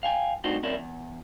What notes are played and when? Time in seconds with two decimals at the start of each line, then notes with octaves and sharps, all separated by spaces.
0.03 F5 G5 G#5
0.44 G3 A3 C4 D4 D#4 F#4
0.63 F#3 C4 C#4 E4 A#4 D5
0.75 E2